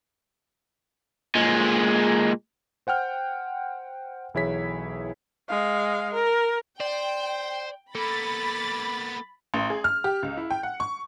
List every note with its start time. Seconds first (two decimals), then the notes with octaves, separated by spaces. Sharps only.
1.35 A#2 G#3
2.87 C5 F#5 G5 F6 G6
4.34 B1 E3 E4 G#4 C#5 B6
5.48 G#3 F5
6.14 A#4
6.80 C5 D5 G5
7.95 A#3 B3 A4 B5 A6
9.54 A1
9.70 G#4
9.84 F6
10.04 G4
10.23 C#2
10.37 E4
10.51 G5
10.63 F#5
10.80 C#6